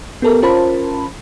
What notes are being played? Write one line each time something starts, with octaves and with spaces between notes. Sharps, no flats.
B3 G4 A4 A#4
C#4 F4 A#4 C5 A5 B5